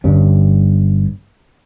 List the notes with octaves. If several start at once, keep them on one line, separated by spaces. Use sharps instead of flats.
G1 G2 C#4